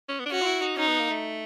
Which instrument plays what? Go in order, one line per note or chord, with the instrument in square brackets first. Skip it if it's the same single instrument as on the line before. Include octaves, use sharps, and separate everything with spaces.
[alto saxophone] C#4
B3
D4
[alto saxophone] C#4 [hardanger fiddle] F#4
[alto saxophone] F4
E4
D#4
[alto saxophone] C#4 [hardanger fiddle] D#4
[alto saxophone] B3
A#3
A3